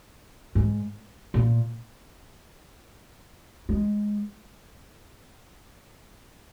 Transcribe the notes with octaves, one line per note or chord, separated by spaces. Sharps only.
G#2
A#2
G#3